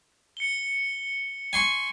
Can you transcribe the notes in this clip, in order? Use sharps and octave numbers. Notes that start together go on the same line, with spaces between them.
C#7 G7
G#5 C6 C#6